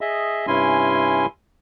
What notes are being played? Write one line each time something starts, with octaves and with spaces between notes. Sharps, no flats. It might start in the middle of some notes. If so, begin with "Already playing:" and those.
G#4 D#5 E5
G2 C3 C#4 E4 G#5 C6